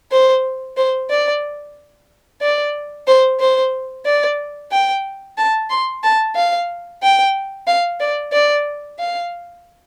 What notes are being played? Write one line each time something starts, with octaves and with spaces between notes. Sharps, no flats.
C5
C5
D5
D5
C5
C5
D5
G5
A5
C6
A5
F5
G5
F5
D5
D5
F5